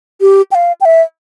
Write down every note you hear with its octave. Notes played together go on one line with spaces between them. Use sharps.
G4
G5
F5
G5
E5